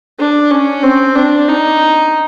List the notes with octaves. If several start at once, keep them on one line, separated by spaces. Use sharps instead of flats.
D4
C#4
C4
D4
D#4